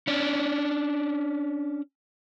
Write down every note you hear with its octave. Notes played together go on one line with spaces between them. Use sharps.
C#4 D4